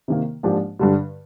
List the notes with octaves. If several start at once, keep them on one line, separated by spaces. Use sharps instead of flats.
C3 D#3 A#3
G#2 F3 A#3 D4 G4
G2 D3 G3